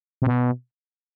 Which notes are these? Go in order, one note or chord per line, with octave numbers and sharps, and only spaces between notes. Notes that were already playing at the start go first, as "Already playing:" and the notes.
C3
B2